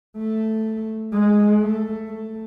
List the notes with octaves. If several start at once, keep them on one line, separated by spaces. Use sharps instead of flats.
A3
G#3
A3
A3